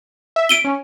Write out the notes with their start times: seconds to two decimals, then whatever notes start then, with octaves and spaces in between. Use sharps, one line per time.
0.36 E5
0.49 D7 D#7 G7
0.65 C#4